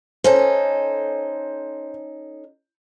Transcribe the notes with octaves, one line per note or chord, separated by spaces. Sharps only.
C#4 D#4 A4 C5